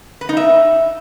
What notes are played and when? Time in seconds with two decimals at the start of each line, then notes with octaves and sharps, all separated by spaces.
0.21 B4
0.29 D#4
0.37 E5